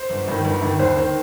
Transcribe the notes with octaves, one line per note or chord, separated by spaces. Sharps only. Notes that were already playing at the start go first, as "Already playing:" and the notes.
Already playing: C5
G1
G2 D#3
G1
G2 D#3
D#2 C5
D#3